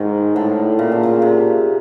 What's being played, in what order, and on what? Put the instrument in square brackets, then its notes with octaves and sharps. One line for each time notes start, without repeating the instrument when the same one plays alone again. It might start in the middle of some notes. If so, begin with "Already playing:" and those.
Already playing: [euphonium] G#2 [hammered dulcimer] D#3
[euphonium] A2 [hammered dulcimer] D3
[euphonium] A#2 [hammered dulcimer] C#3
[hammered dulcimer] D3
C#3
C3